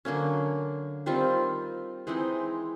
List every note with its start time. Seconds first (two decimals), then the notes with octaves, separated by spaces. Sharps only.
0.05 D3 F#3 A#3 C#4
1.06 D#3 G3 C4 F4
2.07 E3 G#3 C4 D#4